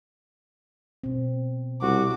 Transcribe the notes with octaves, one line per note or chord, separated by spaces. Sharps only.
B2 C4
C2 F#4 D6